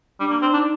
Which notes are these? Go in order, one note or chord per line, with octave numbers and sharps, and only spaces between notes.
G3 D4
A#3
C4
D4 D#4